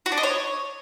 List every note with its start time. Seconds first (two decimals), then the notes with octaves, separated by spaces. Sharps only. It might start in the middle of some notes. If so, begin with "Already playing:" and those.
0.06 F#4
0.12 D4
0.18 D#5
0.23 C#5